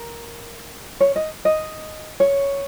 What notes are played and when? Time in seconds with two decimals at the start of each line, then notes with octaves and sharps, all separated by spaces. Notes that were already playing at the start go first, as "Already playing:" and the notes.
Already playing: A#4
1.00 C#5
1.16 D#5
1.45 D#5
2.20 C#5